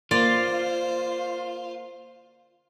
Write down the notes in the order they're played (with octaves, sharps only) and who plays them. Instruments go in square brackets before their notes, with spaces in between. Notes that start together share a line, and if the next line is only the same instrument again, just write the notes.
[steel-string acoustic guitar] A#3 [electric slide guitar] F4 [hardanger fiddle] C5 [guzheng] D5